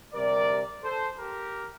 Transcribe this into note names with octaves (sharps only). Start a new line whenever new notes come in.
D2 C3 G3 A#4 D5
A4 C5
G4 A#4